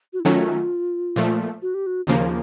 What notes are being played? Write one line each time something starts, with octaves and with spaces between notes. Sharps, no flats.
F#4
E4
D#3 F#3 A3 C#4 F4
A#2 F3 A3
F#4
G4
F#4
D#2 C#3 F3 A#3 D4
C#4